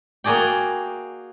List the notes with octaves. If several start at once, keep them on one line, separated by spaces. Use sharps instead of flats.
A#3 F#4 G#4 D5 G5